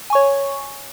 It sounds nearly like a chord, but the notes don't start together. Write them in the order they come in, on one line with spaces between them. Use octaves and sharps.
G#5 C#6 C#5